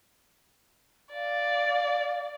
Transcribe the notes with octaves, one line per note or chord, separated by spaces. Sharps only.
D5 F5